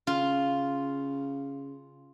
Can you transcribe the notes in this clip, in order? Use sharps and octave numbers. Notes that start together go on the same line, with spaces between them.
C#3 F4